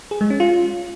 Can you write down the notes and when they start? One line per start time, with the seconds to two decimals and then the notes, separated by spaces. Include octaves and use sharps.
0.11 G#4
0.21 G#3
0.30 C#4
0.40 F4